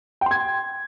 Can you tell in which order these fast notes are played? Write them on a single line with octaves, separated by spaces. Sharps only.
G5 C6 G#6